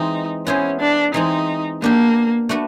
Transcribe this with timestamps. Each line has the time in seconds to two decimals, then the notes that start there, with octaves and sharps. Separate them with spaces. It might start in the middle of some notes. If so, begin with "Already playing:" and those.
Already playing: E3 G#3 C4 D#4
0.46 B3 C#4 E4 G#4 C5
0.80 D4
1.14 E3 G#3 C4 D#4
1.82 A#3 B3 D4 G4
2.49 A3 D4 F#4 B4